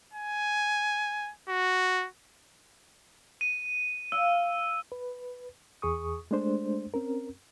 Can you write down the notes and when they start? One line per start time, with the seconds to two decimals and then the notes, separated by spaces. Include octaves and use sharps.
0.14 G#5
1.49 F#4
3.41 D#7
4.12 F5 E6
4.92 B4
5.82 E2 G#4 C#6 D#6
6.31 G#3 A3 D4 C5
6.94 C4 C#4 A#4